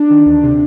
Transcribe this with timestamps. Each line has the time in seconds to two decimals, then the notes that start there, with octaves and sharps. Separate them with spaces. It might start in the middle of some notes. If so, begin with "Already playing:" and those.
Already playing: D4
0.10 D#3
0.26 D2
0.43 C3